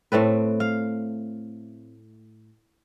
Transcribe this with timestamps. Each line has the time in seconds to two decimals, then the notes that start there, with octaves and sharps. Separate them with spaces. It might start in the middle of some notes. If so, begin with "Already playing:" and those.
0.12 A2 A3 C4 B4
0.60 F5